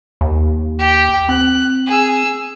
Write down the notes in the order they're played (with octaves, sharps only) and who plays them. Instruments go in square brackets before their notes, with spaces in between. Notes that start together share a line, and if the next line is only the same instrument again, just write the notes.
[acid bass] D#2
[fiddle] G4 G5
[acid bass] C4 [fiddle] F#6
[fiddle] G#4 E6